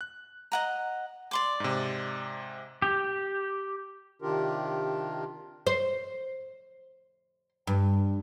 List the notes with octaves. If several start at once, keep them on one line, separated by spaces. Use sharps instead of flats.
F#6
D#5 F#5 A#5
D5 C6 D6
G#2 C3
G4
C3 D#3 D4 F4 G4 A#4
C5
G2